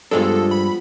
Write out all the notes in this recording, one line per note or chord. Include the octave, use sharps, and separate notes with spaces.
G2 F3 G#3 B3 D4 A4 D#6
B5